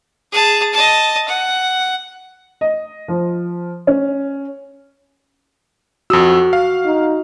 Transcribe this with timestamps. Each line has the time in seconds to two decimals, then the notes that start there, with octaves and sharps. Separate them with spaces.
0.32 G#4 A5
0.74 D#5 A5
1.28 F#5
2.61 D#5
3.08 F3
3.87 C#4
6.10 F2 F#4 D#6 E6
6.53 F5
6.85 D#4